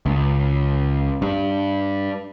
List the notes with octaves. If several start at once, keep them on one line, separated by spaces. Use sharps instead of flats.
C#2
G2